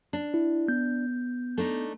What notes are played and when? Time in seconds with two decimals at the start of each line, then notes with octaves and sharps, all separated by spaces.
0.13 D4
0.34 E4
0.68 B3 G6
1.57 A3 D4 D#4